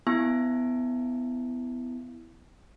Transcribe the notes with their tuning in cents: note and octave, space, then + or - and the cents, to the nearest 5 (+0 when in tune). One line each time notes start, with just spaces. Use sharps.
B3 +20 E4 +0 G#5 +35